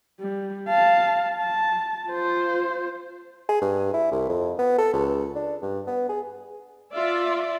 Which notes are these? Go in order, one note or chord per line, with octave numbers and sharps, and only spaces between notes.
G3
F5 A5
A5
F4 C5
G#4
G2
E4
C2
F2
B3
A4
C#2
D4
G2
B3
G#4
F4 D5 E5